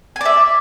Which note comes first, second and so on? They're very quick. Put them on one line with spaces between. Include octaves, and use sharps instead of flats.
G#5 D5 E5